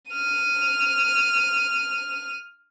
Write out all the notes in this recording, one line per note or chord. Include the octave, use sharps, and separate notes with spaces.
F6 D#7